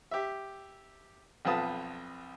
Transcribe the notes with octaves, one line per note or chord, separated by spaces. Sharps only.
G4 E5
B1 F2 F4 B4 A5 D#6